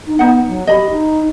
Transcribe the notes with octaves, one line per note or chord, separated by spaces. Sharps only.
D#4
B3 D#4 F#5
F#3
G4 D#5 B5
D#4